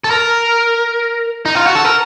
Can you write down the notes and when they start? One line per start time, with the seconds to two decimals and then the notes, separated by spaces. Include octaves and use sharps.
0.04 A4
0.10 A#4
1.45 D#4
1.55 F4
1.66 F#4
1.75 A4
1.85 A#4